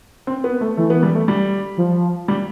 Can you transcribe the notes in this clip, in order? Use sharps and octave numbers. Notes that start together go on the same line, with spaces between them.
C4
B3
A3
E3 A3
B3
G3
A3
G3
F3
G3